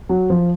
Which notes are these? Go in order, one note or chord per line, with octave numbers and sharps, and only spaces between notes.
F#3
F3